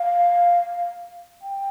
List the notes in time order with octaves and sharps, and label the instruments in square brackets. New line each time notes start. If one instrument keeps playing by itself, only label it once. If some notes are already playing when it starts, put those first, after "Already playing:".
Already playing: [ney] F5
G5